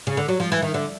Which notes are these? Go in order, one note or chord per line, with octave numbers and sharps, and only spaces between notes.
C#3
D3
F#3
F3
E3
D#3
D3